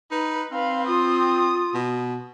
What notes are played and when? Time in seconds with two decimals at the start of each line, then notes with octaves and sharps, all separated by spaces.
0.11 D#4 B4
0.52 C4 B4 F5
0.87 F4 D#6
1.74 B2